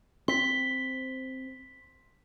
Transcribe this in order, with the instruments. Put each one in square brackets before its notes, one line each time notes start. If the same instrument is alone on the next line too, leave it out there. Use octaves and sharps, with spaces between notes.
[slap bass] C4 [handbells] C6 B6